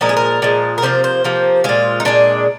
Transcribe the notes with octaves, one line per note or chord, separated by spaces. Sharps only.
A#2 F3 G#3 A#4
G#4
A#4
A#2 F3 G#3
A#4
C3 F3 A#3 C5
C5
C3 F3 A#3
A#2 G#3 F4
D#4
A#2 G#3 D4